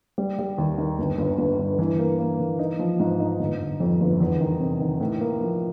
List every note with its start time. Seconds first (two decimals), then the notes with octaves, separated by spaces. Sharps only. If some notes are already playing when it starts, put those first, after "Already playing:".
0.18 G3
0.39 G3
0.58 D#2
0.78 D#3
0.99 G1
1.18 G1
1.38 G1
1.59 G2
1.79 E3
1.99 A#3
2.19 A#3
2.40 E3
2.59 D#4
2.79 F3
3.00 G#2
3.20 D#4
3.40 G1
3.60 G1
3.80 F2
4.00 G1
4.20 E2
4.41 D#3
4.60 C3
4.80 D#3
5.00 A2
5.20 A#3
5.41 F3